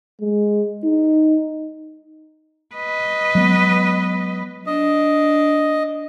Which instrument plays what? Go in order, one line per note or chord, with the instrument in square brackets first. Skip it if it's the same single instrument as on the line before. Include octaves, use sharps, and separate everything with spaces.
[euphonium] G#3
D#4
[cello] B4 D#5
[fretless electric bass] F#3 G#3 B3
[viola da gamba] D4 [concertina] D#5